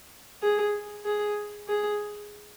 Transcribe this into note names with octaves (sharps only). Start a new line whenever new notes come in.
G#4
G#4
G#4